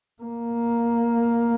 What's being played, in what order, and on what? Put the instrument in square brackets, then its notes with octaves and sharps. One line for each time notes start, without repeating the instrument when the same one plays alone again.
[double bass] A#3